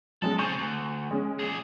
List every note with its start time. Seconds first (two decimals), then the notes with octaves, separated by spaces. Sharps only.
0.22 F#3 G#3 C#4 A4
0.39 C#3 C4 G#5 C#6 G6
0.58 D2
1.11 G#3 C#4
1.39 A#2 G#4